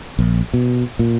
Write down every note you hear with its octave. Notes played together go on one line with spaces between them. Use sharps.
A#1
B2
A#2